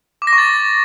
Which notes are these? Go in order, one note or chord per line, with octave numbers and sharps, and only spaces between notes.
D6
A#6
C#6
A6